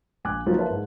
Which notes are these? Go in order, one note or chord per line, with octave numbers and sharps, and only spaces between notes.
A#1 G#5 D6 F#6
F3 F#3 A#3 D#4 F4
A#4 B4 C#5 E5 F5 A5
G#2